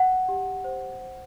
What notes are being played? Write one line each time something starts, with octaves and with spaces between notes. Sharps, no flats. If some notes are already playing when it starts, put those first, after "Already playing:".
Already playing: F#5
G4
C5
C5